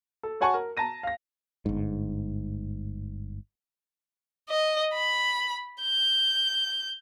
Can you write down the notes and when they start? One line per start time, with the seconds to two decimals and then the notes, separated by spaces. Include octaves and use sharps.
0.23 A4
0.41 F#4 C#5 F#5 G#5 A5 C#6
0.54 A#4
0.77 A5 A#5 A#6 D#7
1.03 F5 A#6
1.66 G1 G#2
4.49 D#5
4.93 B5
5.82 G6